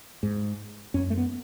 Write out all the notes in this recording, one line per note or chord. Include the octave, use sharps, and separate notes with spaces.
G#2
F#2 C#4
A3
B3